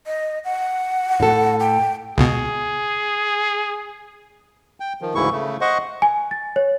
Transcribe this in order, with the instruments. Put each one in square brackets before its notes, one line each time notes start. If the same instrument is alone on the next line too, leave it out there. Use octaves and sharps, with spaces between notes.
[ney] D#5
F#5
[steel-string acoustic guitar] A2 A4
[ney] G5
[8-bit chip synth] C#2 B2 [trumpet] G#4
[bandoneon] G5
D#3 F3
D2 G#2 C#3 E3 E4 C#6
C#3 A3
C5 D#5 F#5 C#6
[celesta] G#5
A6
C#5